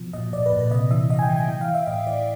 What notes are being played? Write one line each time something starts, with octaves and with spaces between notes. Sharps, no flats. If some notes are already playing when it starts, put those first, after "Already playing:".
Already playing: B2 F3
A#2 D#5
A#2 D5
B4
A#2
B4
C3 D#5
E3 E5
E3 D#5
G#5
G5
E3
G#5
E3 G5
F5
E3
E5
A2 D#5
E3 D5